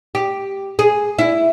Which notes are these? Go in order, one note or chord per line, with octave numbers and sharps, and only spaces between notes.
G4
G#4
E4